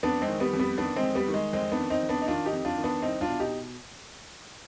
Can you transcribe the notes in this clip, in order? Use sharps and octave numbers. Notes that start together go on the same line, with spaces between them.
F2 B3 D4
G#3 C4
D#3
G3 B3
F2
G3 B3
D#3 B3 D4
G#3 C4
F2
G3 B3
D#3
G#3
F2 G#3 C4
B3 D4
D#3
C4 D#4
F2
B3 D4
D#4
D#3 D4 F4
D#4 G4
F2
D4 F4
D#3
B3 D4
C2 C4 D#4
D4 F4
B2
D#4 G4